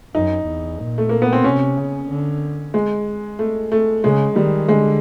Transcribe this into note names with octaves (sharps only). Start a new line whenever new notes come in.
F#2 D#4
E2
A#2
A3
A#3
B3
C4
C3 C#4
C#3
D3
G#3
A3
A3
C#3 G#3
D#3 G3
D3 G#3